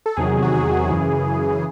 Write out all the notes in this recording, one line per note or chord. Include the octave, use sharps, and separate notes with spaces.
A4
E2 C3 D#3 F#3 G#4
F#4
G#4
G#4
F#2 C#3 E3
G#4